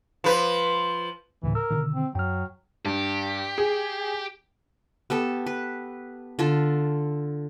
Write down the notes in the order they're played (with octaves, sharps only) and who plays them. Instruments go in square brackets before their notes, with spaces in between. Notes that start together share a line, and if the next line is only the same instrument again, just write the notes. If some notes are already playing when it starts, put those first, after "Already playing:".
[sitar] F3 B4
[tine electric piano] D2 A2 C#3 [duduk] E3
[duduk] A#4 [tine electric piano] E6
[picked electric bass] B2 D3 D#3
[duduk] C4
[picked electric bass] F#2 [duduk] F#3 [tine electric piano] G5 F6
[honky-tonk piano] G2 [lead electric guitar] G4
[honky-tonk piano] G#4
[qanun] B3 G4 A4
B4
D3 F4 A4